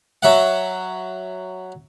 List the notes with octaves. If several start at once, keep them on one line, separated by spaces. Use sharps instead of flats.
F#3 E5 F#5